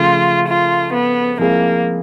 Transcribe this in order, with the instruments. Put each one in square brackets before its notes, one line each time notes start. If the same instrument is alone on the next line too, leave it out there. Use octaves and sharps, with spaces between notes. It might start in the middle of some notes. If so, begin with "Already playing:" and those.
Already playing: [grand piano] C#3 F3 A3 C#4 [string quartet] F4
[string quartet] F4
B3
[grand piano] F3 G#3 C4 E4 G#4 [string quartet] A#3